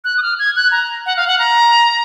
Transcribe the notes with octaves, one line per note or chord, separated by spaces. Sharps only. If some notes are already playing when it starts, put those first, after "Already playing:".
F#6
D#6
F6
G#6
F#6
A#5
F#5
F5
F#5
A#5